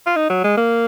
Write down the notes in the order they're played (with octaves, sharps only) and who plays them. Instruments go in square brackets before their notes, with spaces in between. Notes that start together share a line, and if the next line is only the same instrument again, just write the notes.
[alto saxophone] F4
D#4
F#3
G#3
A#3